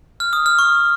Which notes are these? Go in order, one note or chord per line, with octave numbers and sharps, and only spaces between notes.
F6
D#6
F6
C#6